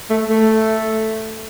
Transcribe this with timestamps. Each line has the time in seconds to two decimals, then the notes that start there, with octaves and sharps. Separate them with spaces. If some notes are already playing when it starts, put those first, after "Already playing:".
0.10 A3
0.29 A3